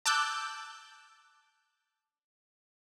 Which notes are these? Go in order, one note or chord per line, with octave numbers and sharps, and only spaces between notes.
A5 D6 E6 F#6 G6